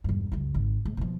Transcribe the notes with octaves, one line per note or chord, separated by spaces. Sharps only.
E1 G2
C#2 F#2
G#1
G#2
B2 F3